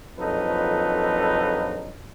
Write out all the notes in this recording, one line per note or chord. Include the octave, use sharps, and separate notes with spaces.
A#1 F2 F#3 D#4 A4 B4